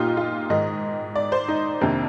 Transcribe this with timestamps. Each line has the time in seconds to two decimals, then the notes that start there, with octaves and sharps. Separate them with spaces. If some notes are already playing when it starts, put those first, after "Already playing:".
Already playing: A#2 D#4 F4 G4
0.17 F4
0.50 G#2 D#3 G#3 D#5
1.15 D5
1.32 C5
1.48 D#4
1.81 F2 C3 D#3 A#3 D4